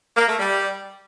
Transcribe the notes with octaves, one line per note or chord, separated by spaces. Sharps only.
A#3
A3
G3